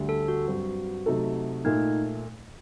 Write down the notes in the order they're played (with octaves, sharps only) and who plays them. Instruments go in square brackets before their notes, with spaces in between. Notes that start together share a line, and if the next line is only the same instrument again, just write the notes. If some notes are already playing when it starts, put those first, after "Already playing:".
Already playing: [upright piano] D2 D3 G3
[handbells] A4
F#4
[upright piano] G2 F#3 C4
C3 F#3 A3 D#4 A4
[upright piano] A#2 A3 [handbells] D#4